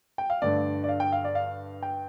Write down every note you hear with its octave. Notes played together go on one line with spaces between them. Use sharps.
G5
F5
G2 D3 A3 D5
D5
F5
G5
F5
D5
F5
G5